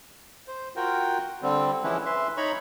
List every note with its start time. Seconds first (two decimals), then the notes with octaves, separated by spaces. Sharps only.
0.48 C5
0.76 F4 F#4 A#4 G5
1.42 D3 G3 C4
1.84 E3 F3 G#3 C#4 E4 B4
2.06 B4 E5 C6
2.37 D#4 C#5 A#5 B5 C#6